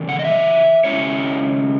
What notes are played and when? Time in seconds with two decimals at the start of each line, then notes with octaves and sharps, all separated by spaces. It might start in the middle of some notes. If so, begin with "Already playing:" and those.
Already playing: C#3 E3
0.09 F#5
0.19 D#5
0.24 E5
0.84 C#3 G#3 C#4 E4 C#5